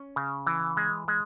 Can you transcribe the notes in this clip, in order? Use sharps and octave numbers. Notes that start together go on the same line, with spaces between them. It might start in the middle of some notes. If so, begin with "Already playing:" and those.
Already playing: C#4
C#3
E3
G#3
G#3